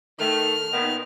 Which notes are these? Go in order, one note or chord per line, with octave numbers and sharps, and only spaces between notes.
D#3 A3 F6
A#2 D#3 B3